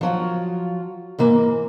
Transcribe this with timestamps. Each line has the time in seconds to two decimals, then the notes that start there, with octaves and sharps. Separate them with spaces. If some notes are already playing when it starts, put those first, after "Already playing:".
0.01 F3 F#3 F4
1.19 G#2 E3 A#3